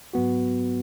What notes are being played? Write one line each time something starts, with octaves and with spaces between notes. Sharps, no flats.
G#2 F#3 B3 F#4